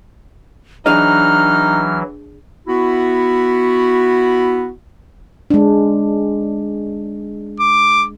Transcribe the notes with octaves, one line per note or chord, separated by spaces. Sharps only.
E3 F#3 D4 D#4 G#4 D#5 F6
B3 E4 F#4
G#3 D4
D6